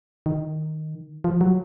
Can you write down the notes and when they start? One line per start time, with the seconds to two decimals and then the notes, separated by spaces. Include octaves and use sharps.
0.26 D#3
1.24 F3
1.41 F#3